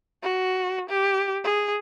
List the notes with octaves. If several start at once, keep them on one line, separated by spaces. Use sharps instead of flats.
F#4
G4
G#4